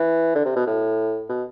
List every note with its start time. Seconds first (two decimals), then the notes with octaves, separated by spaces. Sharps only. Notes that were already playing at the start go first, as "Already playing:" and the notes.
Already playing: E3
0.35 D3
0.45 C3
0.56 B2
0.67 A2
1.29 B2